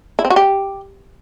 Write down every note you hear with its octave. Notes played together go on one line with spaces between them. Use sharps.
E4
C4
F#4
G4